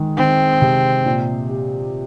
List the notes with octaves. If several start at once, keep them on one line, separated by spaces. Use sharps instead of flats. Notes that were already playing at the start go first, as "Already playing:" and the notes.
Already playing: D#3 G#3
D#3 C4
C3
A#2
G4